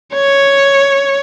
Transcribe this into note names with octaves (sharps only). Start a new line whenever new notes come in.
C#5